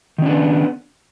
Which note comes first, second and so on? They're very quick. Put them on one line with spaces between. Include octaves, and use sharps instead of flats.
D#3 C#4 D4 B3